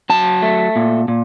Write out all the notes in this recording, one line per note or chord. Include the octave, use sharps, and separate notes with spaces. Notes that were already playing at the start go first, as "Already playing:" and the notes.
F#3 A5
A3
A#2
A#2